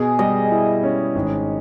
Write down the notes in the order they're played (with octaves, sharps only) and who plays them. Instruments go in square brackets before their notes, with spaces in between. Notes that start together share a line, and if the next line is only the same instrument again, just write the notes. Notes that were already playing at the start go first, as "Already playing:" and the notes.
Already playing: [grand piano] B2 [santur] G#4
[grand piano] G3 [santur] D#5
[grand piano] E4
C#4
G#1